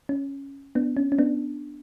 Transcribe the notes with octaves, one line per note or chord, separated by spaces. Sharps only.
C#4
B3 D4
C#4
C#4
B3 D4